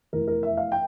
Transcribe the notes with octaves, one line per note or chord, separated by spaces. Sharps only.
F1 E2 E3 A#4
A#4
E5
F5
G5